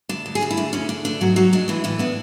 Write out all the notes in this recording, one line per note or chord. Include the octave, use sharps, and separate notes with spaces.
D2 D4
D2
G#4
D2 F#4
E4
D2 D4
D2 C#4
D2 D4
A3 D4
G#2 F#3 F#4
F#3 C#4 F#4
G#3 D4
E3 G#3 E4
A2 E3 E4
B3 D4